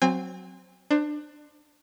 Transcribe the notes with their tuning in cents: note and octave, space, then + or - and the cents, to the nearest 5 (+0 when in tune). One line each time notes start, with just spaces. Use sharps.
F#3 +0 C4 +0 G#5 -40
D4 +25 C5 +0